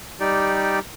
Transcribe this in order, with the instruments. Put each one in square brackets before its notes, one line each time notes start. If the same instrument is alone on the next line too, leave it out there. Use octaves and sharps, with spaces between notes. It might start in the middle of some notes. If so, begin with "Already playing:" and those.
[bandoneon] G3 D#4 G4 D5